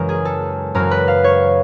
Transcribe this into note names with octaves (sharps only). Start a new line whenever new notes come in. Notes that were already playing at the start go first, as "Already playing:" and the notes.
Already playing: F#2 C#3 E3 G#3 A#4
G#4
A4
F#2 C#3 E3 A#4
B4
F5
C#5